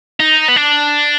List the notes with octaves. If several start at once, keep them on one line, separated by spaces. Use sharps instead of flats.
D#4
B3
D4